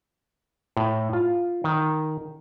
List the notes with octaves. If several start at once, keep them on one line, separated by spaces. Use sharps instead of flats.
A2
F4
D#3